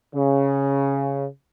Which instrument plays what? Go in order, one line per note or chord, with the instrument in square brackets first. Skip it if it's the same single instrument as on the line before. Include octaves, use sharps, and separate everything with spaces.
[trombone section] C#3